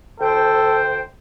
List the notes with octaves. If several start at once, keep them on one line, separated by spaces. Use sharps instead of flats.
D2 A4 C5 G5